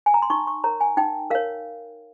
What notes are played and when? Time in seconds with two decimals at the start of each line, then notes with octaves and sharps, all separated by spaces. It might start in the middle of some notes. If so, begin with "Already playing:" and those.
0.06 G#5
0.14 A#5
0.22 C6
0.30 D#4 C#6
0.47 C#6
0.64 A#4 C#5 A#5
0.81 G#5
0.97 D#4 G5
1.30 A#4 C#5 F5